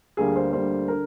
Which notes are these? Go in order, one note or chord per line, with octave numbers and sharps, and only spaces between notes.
D2 D3 G3 A#3 G#4
C5
D2 D3 G3 A#3 C5
D3 A#4